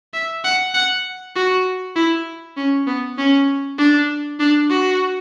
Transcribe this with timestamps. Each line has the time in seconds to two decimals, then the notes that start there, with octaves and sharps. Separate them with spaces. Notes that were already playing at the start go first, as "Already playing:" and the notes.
0.14 E5
0.44 F#5
0.74 F#5
1.35 F#4
1.95 E4
2.57 C#4
2.87 B3
3.18 C#4
3.78 D4
4.39 D4
4.70 F#4